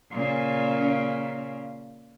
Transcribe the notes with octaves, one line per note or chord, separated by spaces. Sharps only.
A#2 C#3